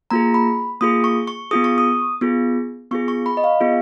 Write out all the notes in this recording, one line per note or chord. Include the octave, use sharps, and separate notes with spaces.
A#3 F4 G#4 A#5
B5
A#3 F4 G#4 D#6
C#6
C#6
B3 F4 G#4 D#6
C#6
D#6
B3 F4 G#4
B3 F4 G#4 C#6
C#6
B5
D#5
F5
B3 F4 G#4